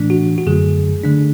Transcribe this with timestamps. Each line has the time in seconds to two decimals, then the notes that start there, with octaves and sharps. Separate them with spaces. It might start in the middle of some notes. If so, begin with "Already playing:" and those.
Already playing: A2 E3 A3 D4
0.10 F#4
0.38 F#4
0.46 F#2 D3 F#3 A3 G#4
1.04 D3 A3 D4